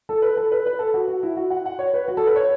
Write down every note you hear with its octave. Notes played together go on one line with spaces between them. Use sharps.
A4
B4
A4
B4
B4
A4
F#4
F#4
E4
F#4
F#5
F#5
C#5
B4
F#4
A4
B4
C#5